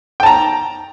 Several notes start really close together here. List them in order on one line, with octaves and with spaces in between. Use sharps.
G5 A5 A#5